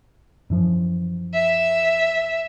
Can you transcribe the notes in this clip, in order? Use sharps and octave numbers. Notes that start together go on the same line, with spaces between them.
F#2 E3 F3
E5